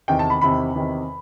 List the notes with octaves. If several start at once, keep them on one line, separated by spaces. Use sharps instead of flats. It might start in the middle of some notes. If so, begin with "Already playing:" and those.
E2 C3 D#3 G5
A5
B5
E2 C3 D#3 B5
E2 C3 D#3